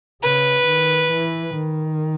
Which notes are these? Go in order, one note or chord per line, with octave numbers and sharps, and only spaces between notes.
C#3 B4
D#3
E3
D#3